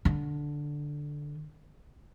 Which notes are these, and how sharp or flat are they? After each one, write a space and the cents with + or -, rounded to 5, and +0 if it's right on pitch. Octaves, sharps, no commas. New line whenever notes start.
D3 +0